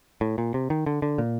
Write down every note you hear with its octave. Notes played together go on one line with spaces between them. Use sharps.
A2
A#2
C3
D#3
D3
D3
A#2